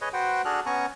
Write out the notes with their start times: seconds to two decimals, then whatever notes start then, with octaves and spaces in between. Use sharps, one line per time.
0.01 G#4 B4 C#5 D#5
0.13 F#4 B4 C5 F#5 G5
0.45 D4 F#4 G#4 A4 F6 F#6
0.66 B3 C#4 G#5 A#5 C#6